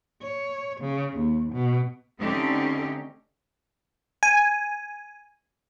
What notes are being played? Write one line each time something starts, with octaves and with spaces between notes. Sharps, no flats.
C#5
C#3
D#2
B2
D3 A3 C4 C#4 D#4 G4
G#5